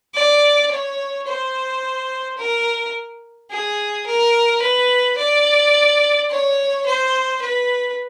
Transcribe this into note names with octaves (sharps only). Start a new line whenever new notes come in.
D5
C#5
C5
A#4
G#4
A#4
B4
D5
C#5
C5
B4